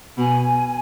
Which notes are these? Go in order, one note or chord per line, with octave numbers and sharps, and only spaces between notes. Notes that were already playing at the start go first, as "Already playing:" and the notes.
B2 G#5